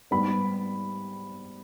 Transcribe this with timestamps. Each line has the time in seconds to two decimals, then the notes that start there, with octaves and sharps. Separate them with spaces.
0.11 G#2 G3 B3 B5